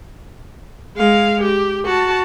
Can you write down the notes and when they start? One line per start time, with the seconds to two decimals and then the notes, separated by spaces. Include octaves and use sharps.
0.97 G#3 F5
1.43 G4
1.86 F#4 A5